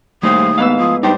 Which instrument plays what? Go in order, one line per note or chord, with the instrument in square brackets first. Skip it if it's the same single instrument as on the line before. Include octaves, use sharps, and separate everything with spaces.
[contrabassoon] D#2 [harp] A2 [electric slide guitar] G3 C5 F5 [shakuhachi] D#6
[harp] G#2 B3 E6 [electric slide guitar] F5
[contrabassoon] F3 [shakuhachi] D#6
[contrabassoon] G2 [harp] D4 C5 [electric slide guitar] D#4 [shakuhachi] G5